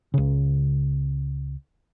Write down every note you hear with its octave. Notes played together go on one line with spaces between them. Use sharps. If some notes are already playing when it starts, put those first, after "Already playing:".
C#2 C#3